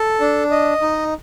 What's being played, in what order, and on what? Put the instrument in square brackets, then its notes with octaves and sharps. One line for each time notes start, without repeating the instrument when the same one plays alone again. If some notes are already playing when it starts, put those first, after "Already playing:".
Already playing: [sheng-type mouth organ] A4
D4
D#5
D#4